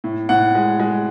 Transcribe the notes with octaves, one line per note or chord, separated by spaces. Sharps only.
A2
A2 F#5
G#3
G#3